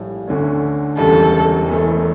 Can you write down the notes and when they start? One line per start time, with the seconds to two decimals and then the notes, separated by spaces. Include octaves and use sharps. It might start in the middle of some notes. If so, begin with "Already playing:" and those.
Already playing: A#1 A2 G3
0.28 D2 D3 A3 C#4
0.97 E1 D2 C#3 E3 G3 A4
1.67 E1 E2 E3 A3